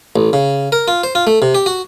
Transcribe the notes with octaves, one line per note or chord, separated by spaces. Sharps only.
A1
C#3
A#4
F4
C5
F4
A3
C3
G4
F#4